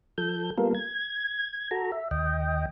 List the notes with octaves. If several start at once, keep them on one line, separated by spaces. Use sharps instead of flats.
F3 A4 G6
G3 A#3 B3 F4 A4 A#4
G#6
F#4 A4 A#5
E5
D#2 D#5 G5